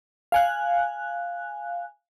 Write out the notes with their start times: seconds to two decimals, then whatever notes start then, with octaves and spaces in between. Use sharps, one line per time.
0.32 F5 G#5 F#6